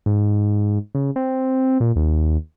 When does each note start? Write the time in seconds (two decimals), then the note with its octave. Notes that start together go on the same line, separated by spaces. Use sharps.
0.06 G#2
0.95 C#3
1.16 C4
1.80 A#2
1.96 D#2